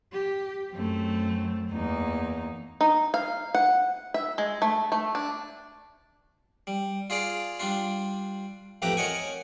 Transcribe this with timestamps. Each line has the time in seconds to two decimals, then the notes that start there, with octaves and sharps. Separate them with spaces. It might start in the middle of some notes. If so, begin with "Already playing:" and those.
0.13 G4
0.73 F#2 A3 C4
1.71 E2 A#3 D#4
2.81 D#4
3.14 F5
3.55 F#5
4.14 E5
4.38 G#3
4.62 A3
4.92 A3
5.15 D4
6.67 G3
7.10 F4 G#4 D5 F5
7.60 G3 D4 F4
8.82 A1 F2 A3 G4 B4 A#5
8.97 A#4 C#5 D#5 F#5 G#5